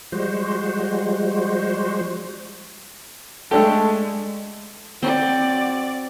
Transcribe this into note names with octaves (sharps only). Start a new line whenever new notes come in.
F3 G3 G#3 F#4 C5
G#3 A3 D4 G4 A4
C4 F#4 D5